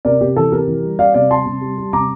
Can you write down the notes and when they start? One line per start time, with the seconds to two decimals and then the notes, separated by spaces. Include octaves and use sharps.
0.05 C3 A#4 D5
0.21 C3 G4
0.36 E3 A4
0.52 C3 G4 A#4
0.68 E3
0.83 G3
0.99 G3 D5 F5
1.14 C3 D5 F5
1.30 G3 A5 C6
1.46 C3
1.61 G3
1.78 G3
1.93 C3 A#5 D6